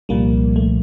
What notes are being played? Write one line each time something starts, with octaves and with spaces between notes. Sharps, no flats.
C2 A#2 F3 G3 A#3
A3